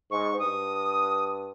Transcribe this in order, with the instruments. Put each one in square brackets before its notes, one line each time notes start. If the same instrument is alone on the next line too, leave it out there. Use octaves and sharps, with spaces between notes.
[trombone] G#2 [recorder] C#6
[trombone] G2 [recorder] D#6